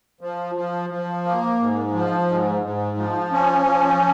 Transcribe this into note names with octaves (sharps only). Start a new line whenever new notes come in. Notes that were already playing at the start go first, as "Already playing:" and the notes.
F3
F3
F3
A#3
G#2
F3
G#2
G#2
F3
C#4
F3